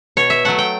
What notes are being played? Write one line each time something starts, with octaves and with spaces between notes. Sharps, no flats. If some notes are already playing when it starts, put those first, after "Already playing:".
B2 C#5
E5
F#3 A3 F#5
G5